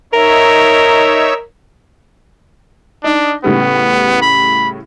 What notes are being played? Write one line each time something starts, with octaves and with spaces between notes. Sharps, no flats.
D#4 A#4 C#5 E5
D4 D#4
A2 C#3 G3 B3
B5